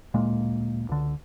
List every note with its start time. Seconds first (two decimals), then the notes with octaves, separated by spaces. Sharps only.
0.14 D1 A#2 G#3 A#3
0.89 C#2 D3